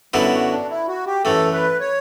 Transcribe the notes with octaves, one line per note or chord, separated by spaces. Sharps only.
F#2 D3 F#3 G3 B3 E4
F#4
D4
E4
F#4
G4
F#2 E3 A3 A4
B4
C#5